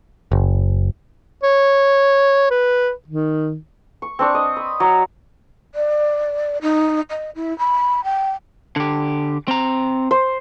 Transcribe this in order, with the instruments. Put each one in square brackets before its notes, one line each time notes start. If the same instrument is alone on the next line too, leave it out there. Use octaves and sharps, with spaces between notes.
[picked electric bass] F#1
[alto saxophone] C#5
B4
D#3
[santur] C#6
C4 D4 C#6
D#5
B5
F#3
[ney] D5
D#4
D#5
E4
B5
G5
[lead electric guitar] D3 G4
C4 A#5
[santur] C5